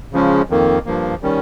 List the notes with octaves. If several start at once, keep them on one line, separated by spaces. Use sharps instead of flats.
C#3 F3 G#3 C#4
F2 D#3 A#3
G2 F3 A#3
D#3 G3 C#4